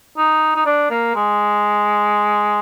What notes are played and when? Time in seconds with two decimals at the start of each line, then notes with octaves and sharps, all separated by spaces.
0.17 D#4
0.56 D#4
0.66 D4
0.90 A#3
1.15 G#3